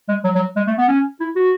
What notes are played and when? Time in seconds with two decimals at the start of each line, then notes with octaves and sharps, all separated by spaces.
0.09 G#3
0.24 F#3
0.35 F#3
0.56 G#3
0.67 A3
0.78 B3
0.88 C#4
1.20 E4
1.36 F#4